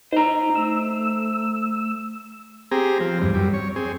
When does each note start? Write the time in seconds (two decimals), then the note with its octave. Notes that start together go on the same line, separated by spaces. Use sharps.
0.13 D#4 C5 A#5
0.55 A3 E6
2.71 C4 G4 G#4 A#5
3.00 F3 C4
3.21 E2 G2
3.34 F#2 G3
3.53 C#5
3.76 C4 G#4